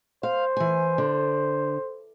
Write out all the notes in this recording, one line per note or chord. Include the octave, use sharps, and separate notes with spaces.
C5 F5
E3 G#5
D3